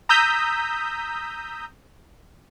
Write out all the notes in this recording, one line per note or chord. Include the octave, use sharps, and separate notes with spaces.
A#5 D#6 E6 G6 B6